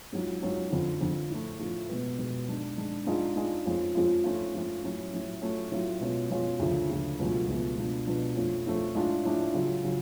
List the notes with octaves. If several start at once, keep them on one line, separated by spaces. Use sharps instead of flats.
G#2 F#3 C#4 F4
G#2 F#3 C#4 F4
F2 D3 F3
F2 D3 F3
A2 F3 A3
A2 F3 A3
B2 G#3 B3
B2 G#3 B3
G#2 G#3 D4
G#2 G#3 D4
G#2 G#3 D4 F4
G#2 G#3 D4 F4
F2 F3 G#3 C#4 F4
F2 F3 G#3 C#4 F4
G#2 F3 A3 C#4 F4
G#2 F3 A3 C#4 F4
A2 F#3 C#4
A2 F#3 C#4
A2 F#3 A3 C#4 F4
A2 F#3 A3 C#4 F4
B2 G#3 C#4 F4
B2 G#3 C#4 F4
D2 C#3 F3
D2 C#3 F3
C#2 B2 F#3 A3 F4
C#2 B2 F#3 A3 F4
B2 G#3 D4 F4
B2 G#3 D4 F4
F2 F3 A3 C#4
F2 F3 A3 C#4
A2 G#3 D4 F4
A2 G#3 D4 F4
C#3 F#3 C#4 F4
C#3 F#3 C#4 F4